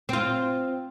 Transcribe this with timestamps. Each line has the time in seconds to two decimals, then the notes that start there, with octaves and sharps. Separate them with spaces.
0.09 C4 F4